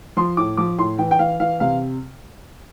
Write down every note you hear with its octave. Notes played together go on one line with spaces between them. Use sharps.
F3 C6
A2 D6
F3 D6
A2 C6
E3 G5
G5
E3 F5
E3 F5
C3 F5